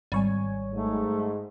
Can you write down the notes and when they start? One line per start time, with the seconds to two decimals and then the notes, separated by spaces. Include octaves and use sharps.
0.12 G#1 G3 C#5 G#5
0.72 G#2 A3